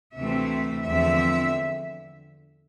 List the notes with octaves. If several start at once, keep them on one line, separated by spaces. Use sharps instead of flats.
D2 C3 E3 A3 C4 E5
E2 D3 F3 C4 E5